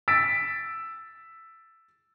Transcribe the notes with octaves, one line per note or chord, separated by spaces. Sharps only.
E6 A6 B6 D7